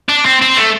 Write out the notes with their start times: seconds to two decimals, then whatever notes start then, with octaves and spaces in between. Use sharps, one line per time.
0.09 D4
0.25 C4
0.41 C4
0.57 A3